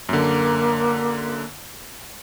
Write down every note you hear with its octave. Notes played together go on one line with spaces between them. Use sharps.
F#2 D3 A#3